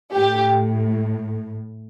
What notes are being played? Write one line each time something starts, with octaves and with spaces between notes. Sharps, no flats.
A2 G4